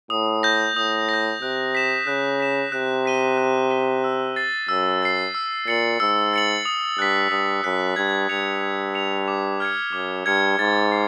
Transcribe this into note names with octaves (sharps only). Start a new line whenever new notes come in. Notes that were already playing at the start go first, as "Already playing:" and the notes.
A2 D#6
G6 A#6
A2 D#6
G6 A#6
C3 F#6
B6 E7
C#3 F#6
B6 E7
C3 F#6
B6 D#7 G7
F#6
B6 D#7 G7
E6
A6 C7
F#2 E6
A6 C7
E6
A#2 A6 C#7 F#7
G#2 E6
A6 C#7 F#7
D#6
G2 F#6 B6
G2 D#6
F#2 F#6 B6
G2 G#6
G2 C#7 F7
G#6
C#7 F7
D6
F6 G#6 C#7
F#2 D6
G2 F6 G#6 C#7
G#2 A6
C7